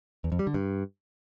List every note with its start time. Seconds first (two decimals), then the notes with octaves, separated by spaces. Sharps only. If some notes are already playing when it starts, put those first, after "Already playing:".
0.24 E2
0.32 F2
0.39 G3
0.47 D3
0.54 G2